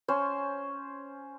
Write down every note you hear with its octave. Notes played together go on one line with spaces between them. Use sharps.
C#4 C5 C6